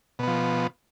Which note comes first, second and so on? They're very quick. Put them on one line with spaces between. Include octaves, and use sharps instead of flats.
B2 B3 F3